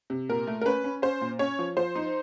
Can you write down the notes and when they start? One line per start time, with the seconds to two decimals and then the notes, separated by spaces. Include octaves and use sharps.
0.10 C3
0.29 A#2 A#4
0.47 A3
0.61 A#4
0.65 C#4 B4
0.84 C#4
1.02 C#4 C5
1.21 A#2
1.39 C#4 C#5
1.59 F3
1.77 F3 C5
1.96 D#4